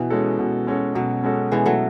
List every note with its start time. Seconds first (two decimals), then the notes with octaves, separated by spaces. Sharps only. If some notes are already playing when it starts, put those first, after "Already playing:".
Already playing: B2 E3
0.10 G#3 C#4 F#4 A4
0.39 B2
0.67 G#3 C#4 F#4 A4
0.95 B2 F#3
1.23 G#3 C#4 F#4 A4
1.52 B2 E3 G#3
1.66 F#3 A3